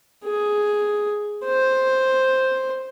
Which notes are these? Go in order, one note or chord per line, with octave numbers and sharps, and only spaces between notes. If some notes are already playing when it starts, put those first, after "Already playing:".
G#4
C5